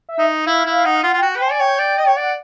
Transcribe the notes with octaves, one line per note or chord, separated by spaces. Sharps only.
E5
D#4
E4 F5
E4 F5
D#4 F#5
F5
F4 F#5
F4
F#4 G5
B4 G5
C5
G#5
D5
C#5 G5
D5
D#5
C#5
D5 F#5